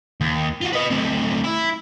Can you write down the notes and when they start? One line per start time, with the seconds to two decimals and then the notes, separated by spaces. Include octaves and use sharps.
0.21 D#2
0.61 F4 F#4
0.73 B4 D#5
0.90 D2 C4
1.44 E4